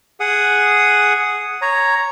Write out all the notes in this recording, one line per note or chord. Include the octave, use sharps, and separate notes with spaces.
G#4 F#5 D#6
C#5 A#5